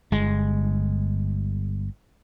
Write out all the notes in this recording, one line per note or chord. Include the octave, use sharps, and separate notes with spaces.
G1 G#3